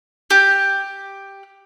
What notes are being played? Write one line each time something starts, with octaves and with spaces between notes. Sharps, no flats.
G4